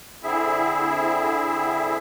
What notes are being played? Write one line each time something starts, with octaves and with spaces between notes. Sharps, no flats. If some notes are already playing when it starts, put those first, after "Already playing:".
D3 C4 E4 G#4 E5